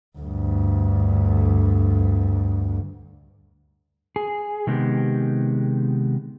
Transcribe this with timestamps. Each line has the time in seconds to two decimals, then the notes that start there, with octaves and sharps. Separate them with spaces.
0.18 D2 G2
4.16 G#4
4.67 C3 D#3 G#3 B3 G4